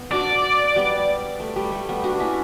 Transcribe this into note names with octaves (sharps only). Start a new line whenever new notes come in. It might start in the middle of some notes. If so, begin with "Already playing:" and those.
Already playing: B3
D4 F#4 D5
G3 B3
A3
G3
A3
G3 B3
D4 F#4
C#4 E4